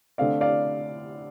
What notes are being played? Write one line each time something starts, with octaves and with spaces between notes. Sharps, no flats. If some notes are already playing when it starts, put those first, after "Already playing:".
D3 A3 C4 D5 F5
D5 F5